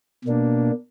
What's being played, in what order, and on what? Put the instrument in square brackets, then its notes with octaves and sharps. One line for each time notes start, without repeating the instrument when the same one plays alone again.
[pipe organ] B2 A#3 D4